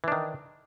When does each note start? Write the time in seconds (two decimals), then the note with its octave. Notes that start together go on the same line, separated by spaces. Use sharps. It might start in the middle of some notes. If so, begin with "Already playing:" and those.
0.04 E3
0.08 D4
0.12 D#3